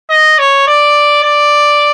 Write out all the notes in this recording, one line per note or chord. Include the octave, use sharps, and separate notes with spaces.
D#5
C#5
D5
D5